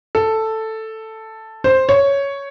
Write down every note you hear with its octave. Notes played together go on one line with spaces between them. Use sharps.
A4
C5
C#5